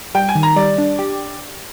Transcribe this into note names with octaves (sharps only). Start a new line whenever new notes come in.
G3 G5
G#5
D#3
A#5
G3 D5
D4
G4